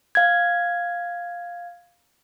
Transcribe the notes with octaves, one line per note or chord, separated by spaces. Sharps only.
F5 G#6